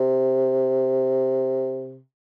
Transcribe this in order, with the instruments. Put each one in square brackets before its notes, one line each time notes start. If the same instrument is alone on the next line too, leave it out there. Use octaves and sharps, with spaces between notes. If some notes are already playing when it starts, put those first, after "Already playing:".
Already playing: [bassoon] C3